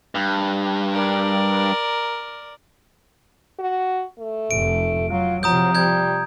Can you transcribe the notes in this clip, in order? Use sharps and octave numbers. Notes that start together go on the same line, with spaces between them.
G2
A#4 D5
F#4
A3
F1 D7
F#3 F4
C3 F3 F#3 A#5 D#6 G6
G3 G6 G#6